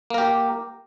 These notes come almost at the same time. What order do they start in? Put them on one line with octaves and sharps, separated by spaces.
A#3 A#4 G4